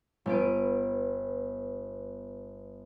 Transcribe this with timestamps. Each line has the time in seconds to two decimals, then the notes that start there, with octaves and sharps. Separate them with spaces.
0.26 G1 B3 D#6 D7